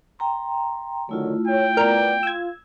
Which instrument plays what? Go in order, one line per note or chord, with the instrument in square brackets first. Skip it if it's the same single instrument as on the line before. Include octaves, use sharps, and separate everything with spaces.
[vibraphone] G5 A#5 C6
[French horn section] D3 D#3 F#3 [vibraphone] A3 E4 F4
[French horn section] C#5 [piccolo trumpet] G5
[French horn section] B3 D5 [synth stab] A#4
[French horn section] F4 [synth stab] E6 G#6